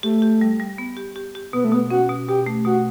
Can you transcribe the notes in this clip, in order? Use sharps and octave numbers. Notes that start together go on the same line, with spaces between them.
A3 G4
G4
G3
G3
B3
G4
G4
G4
B2 B3
A3
B2 B3
C#4 F#4
B2
B2 G4
A3
B2 F#4